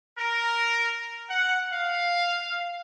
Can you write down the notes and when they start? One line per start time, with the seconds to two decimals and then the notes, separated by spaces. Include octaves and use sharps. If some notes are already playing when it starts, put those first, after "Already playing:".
0.18 A#4
1.29 F#5
1.73 F5